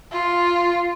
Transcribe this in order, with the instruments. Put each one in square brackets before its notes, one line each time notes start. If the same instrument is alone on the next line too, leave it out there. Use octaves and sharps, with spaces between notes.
[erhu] F4